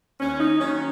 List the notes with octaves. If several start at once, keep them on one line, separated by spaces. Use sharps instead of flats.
D#2 C#4
D#4
D#3 F#3 C#4